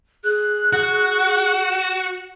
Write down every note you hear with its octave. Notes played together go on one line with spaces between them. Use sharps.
G#4 F#6
F#4